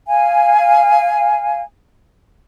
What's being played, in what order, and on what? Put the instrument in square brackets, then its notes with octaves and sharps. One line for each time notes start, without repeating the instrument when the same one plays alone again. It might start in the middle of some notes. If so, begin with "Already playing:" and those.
[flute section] F5 G#5